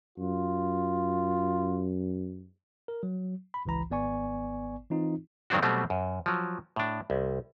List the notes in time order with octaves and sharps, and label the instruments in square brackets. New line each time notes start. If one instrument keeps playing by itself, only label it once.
[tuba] F#2 [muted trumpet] F4
[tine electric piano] A#4
F#3
B5
G#1 C#2 E3 A#5 B5
G#1 B3 D5 G#5 C#6
E3 C4 D#4 F4
[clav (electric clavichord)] G2 D#3 F#3 C4 D4 F#4
B2 F#3 G3 A3 C4
F#2
F3 F#3
A2 D4
C2